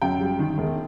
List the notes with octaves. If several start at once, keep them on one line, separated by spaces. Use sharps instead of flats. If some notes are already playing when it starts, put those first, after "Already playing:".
F#2 G5
G3
D#3
E1